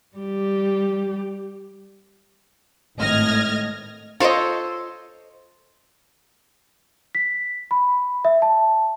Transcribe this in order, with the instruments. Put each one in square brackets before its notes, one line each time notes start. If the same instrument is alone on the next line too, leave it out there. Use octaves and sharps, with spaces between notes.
[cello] G3 G4
[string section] G#1 A2 D#5 F6 G#6 A#6
[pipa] F4 D#5 [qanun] A4 C5 C#5
[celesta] B6
B5
E5
A5